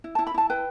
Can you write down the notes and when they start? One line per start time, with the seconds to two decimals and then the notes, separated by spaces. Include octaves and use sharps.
0.04 E4
0.15 E4 A5
0.27 B5
0.34 E4 A5
0.50 B4 G5